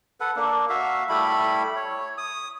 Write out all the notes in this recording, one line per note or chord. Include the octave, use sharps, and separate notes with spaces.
A4 B4 F#5
A#3 D4
F#4 E5 F5
G3 A3 E4 B5
C#5
D#6